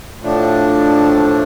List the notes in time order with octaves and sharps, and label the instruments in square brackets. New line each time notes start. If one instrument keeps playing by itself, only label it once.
[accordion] A2 F3 A3 D4